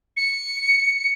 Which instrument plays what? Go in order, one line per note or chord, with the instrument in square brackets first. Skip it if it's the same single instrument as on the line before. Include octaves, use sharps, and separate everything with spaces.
[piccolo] C#7